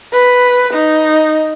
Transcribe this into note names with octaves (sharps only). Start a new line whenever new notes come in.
B4
D#4